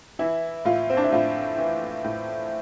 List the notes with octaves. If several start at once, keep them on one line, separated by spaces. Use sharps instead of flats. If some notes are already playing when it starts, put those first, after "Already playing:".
E3 E4
A2 F4
C4
D4
E4
A2 F4
E3
A2